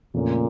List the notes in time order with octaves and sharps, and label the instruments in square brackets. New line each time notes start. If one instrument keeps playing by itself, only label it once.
[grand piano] F2 C#3 A3 C#4 [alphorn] A#2